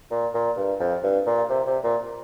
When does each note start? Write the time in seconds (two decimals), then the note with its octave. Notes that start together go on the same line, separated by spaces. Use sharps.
0.11 A#2
0.34 A#2
0.57 G2
0.80 F2
1.03 G2
1.26 A#2
1.50 C3
1.67 C3
1.84 A#2